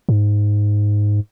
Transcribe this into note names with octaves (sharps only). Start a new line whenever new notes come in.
G#2